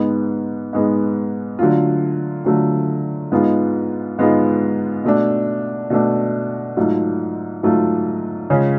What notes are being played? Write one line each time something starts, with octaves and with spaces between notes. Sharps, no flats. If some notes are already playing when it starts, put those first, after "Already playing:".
Already playing: G#2 G#3 B3
G#2 G#3 B3
D3 F#3 A3 F4
D3 F#3 A3 F4
G#2 G#3 B3 F4
G#2 G#3 B3 F4
B2 A3 D4
B2 A3 D4
G#2 F#3 A3 F4
G#2 F#3 A3 F4
C#3 G#3 C#4 F4